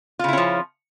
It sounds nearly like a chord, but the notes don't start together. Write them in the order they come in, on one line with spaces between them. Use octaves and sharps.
F4 C#3 E4 C#4 F3